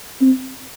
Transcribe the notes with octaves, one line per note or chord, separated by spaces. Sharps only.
C4